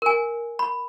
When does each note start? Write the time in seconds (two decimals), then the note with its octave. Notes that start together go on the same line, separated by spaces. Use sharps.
0.02 A#4 G#5
0.59 B5